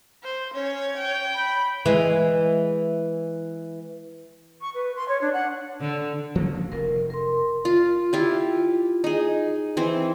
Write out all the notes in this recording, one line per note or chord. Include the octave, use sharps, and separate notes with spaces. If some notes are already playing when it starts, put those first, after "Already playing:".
C5
C#4 C#5
G5
B5
E3 G#3
C#6
B4
C6
C#5
D4
F#5
D3
F3 A#3 C#4
F1 A#4
A#4 C6
F4
E4 F4 G4
D#4 G#4
E3 C4 C5